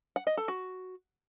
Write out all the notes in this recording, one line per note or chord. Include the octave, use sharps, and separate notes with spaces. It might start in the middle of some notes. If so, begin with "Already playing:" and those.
F#5
D#5
A4
F#4